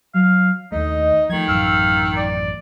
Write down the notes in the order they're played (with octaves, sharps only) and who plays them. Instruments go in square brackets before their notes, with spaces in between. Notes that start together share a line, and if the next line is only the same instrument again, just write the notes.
[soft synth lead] F#3 [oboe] F5
[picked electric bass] D#2 A3 [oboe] D#4 [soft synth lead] D#5
[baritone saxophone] D#3 [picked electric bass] F3 A3 [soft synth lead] G#6
[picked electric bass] A1 F#2 [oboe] F5 [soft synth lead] E6
[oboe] D5